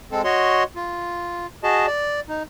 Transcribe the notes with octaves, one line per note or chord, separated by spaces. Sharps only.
G#3 C4 A4
F#4 C#5 D#5 C6
F4
F#4 G#4 D#5 A5
D5
D#4